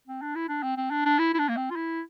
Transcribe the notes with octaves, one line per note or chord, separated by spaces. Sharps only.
C4
D4
E4
D4
C4
C4
D4
D4
E4
E4
D4
A#3
C4
F4
E4